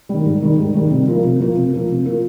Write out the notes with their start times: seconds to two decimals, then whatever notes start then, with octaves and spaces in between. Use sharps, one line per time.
0.09 D#3 G3
0.26 G#2
0.42 D#3 G3
0.58 G#2
0.74 D#3 G3
0.91 C3
1.07 F3 A#3 F4 A#4
1.24 C3
1.40 F3 A#3 F4 A#4
1.56 C3
1.73 F3 A#3 F4 A#4
1.89 C3
2.05 F3 A#3 F4 A#4